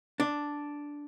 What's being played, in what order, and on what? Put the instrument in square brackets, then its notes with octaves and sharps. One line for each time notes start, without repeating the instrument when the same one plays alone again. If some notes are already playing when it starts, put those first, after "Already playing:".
[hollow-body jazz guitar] D4